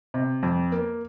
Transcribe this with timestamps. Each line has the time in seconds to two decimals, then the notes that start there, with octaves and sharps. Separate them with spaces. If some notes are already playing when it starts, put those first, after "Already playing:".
0.14 C3
0.43 F2
0.72 A#3